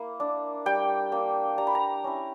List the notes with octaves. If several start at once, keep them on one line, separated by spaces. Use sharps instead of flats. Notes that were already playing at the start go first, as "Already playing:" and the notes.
Already playing: A#3 E4
D4
G3 G5
A#3 D4
G3 A#5
B5
A#5
C#4 E4